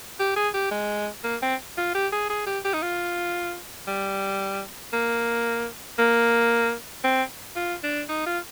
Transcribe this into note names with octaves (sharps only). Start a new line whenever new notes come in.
G4
G#4
G4
G#3
A#3
C4
F4
G4
G#4
G#4
G4
G4
D#4
F4
G3
A#3
A#3
C4
F4
D4
D#4
F4